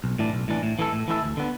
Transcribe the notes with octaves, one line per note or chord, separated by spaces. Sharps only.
B1
A2 E3 D4
B1
A2 E3 D4
A2
E3 A3 E4 A4
A2
E3 A3 E4 A4
D2
D3 B3